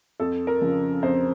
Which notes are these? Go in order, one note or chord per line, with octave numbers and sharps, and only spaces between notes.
F2 A4
A#4
C#3 F3
F2 C5